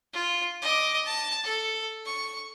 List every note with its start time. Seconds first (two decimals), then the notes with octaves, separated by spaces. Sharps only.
0.13 F4
0.62 D#5 D6
1.05 A5
1.44 A4
2.06 C#6